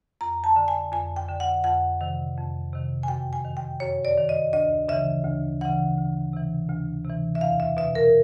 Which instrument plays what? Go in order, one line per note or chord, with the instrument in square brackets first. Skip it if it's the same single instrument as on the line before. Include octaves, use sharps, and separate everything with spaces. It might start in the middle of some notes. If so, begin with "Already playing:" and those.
[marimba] F2 A#5
A5
D3
G#5
F2 G#5
G5
D3
F#5
F2 F#5
C3 D#3
F2
C3 D#3
G#5
F#2 G5
G#5
D#3
G5
F#2 C#5
D5
D#3
D#5
D2 D#5
C#3 E3 E5
D2
C#3 E3 F#5
D2
C3 E3
D2
C3 E3
E5
E2 F5
E5
B2 E5
A#4